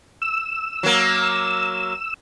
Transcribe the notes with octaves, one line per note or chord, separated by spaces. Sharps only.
E6
F#3 A#3